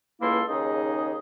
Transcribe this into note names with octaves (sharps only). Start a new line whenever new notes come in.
C#2 E3 A#3 E4 A4 C6
D#2 C#3 D#4 G#4 D#5